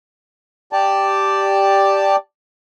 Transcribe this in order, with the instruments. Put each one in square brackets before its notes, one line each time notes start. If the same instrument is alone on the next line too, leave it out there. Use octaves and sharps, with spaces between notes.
[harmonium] G4 D5 A5